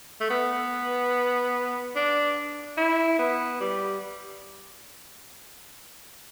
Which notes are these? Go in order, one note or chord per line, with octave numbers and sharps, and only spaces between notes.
A3
B3
D4
E4
B3
G3